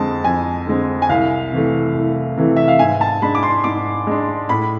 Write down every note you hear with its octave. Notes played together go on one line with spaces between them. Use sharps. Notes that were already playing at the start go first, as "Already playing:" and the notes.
Already playing: F2 D3 G#3 C4 A5
F2 G#5
D3 G#3 C4
G#5
C2 F5
C3 E3 A3
C2
C3 E3 A3
E5
F5
G#2 G#5
A5
G#3 D4 B5
D6
C6
G#2 D6
G#3 D4
A2 B5